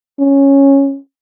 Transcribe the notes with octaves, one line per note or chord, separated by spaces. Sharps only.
C#4